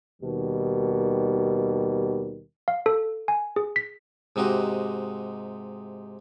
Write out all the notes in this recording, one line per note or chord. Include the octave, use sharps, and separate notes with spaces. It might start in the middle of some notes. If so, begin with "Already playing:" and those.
D#2 B2 D#3 G3
F5
A4
G#5
G#4
B6
G#2 C3 D#4 F#4 G4